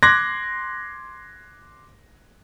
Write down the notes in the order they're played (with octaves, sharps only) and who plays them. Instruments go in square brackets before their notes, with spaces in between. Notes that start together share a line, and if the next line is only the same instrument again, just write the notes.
[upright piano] C6 D6 F#6 G#6 A#6